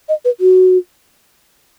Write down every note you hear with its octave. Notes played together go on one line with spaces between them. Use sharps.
D#5
B4
F#4